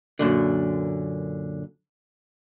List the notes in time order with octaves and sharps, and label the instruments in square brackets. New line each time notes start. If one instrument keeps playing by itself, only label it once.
[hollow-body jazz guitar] F#2 A#2 D3